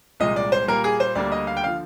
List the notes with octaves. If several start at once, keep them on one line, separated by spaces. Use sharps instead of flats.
C2 A#2 F3 G#3 D#5
D5
C5
A#2 G3 A#3 A#4
G#4
C5
D2 D3 G3 A#3 D5
D#5
F5
G5
D3 F3 F5